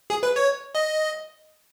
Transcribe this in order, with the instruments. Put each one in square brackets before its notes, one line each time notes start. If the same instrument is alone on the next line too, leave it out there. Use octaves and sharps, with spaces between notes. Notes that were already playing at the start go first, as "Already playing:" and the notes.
[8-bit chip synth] G#4
B4
C#5
D#5